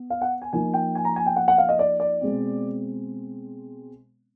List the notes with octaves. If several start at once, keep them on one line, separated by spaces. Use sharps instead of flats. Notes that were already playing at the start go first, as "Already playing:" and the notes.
Already playing: B3
F5
F#5
G#5
F3 A#3 D#4 G#5
G5
G#5
A#5
G#5
G5
F#5
F#5
F5
D#5
D5
D5
B2 G#3 C4